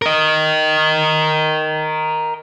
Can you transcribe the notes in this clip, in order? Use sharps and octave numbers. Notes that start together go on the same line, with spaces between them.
A#4 D#5